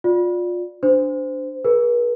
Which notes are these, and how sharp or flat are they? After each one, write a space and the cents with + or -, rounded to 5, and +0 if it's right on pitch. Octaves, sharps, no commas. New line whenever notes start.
F4 +25 D5 +0
D4 +0 C5 -20
G#4 +25 B4 -45